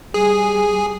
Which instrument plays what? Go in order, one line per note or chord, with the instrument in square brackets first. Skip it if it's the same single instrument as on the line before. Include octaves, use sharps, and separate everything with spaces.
[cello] G3 [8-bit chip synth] G#4